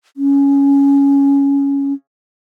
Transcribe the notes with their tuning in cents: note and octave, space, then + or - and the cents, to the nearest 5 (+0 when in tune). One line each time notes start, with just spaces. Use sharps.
C#4 +10